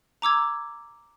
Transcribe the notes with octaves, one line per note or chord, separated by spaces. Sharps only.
A#5 D6 E6 G#6